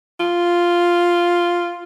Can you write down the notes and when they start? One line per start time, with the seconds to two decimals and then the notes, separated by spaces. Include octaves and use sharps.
0.20 F4